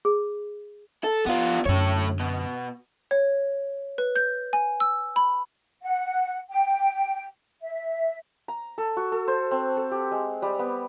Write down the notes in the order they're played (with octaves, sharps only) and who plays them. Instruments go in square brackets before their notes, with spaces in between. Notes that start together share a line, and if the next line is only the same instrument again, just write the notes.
[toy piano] G#4
[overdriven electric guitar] A4
[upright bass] F3 [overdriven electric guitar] B3 F4
[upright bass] F#2 D3 [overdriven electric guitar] A3 C#5
[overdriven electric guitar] B2
[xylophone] C#5
B4
G6
G#5
E6
B5
[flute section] F#5
G5
E5
[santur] A#5
A4
F#4
A4
C5
C4
A4
G4
G#3
G3
B3